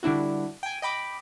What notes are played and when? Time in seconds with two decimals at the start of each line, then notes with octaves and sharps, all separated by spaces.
0.03 D3 G3 D4 E4 F#4
0.63 G5 G#5
0.82 D#5 G5 B5 D6